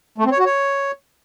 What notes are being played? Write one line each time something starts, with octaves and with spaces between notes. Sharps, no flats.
A3
C4
C#5
F#4
C#5